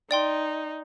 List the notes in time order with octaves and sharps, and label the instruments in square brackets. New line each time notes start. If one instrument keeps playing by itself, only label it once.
[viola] D#4 [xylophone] D5 G5 C6